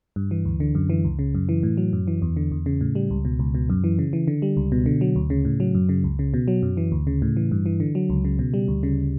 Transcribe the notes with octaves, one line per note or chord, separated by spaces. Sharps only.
G2
E3
D2
D3
F#2
E3
C#2
C#3
F#2
E3
A2
F#3
F#2
E3
E2
D3
E2
C#3
A2
G3
C#2
B2
C#2
B2
F#2
E3
C#3
E3
D3
G3
C#2
B2
D3
F#3
D2
C#3
A2
F#3
F#2
C#3
C#2
C#3
B2
F#3
F#2
E3
D2
C#3
A2
E3
G2
E3
D3
F#3
C#2
C#3
B2
G3
D2
C#3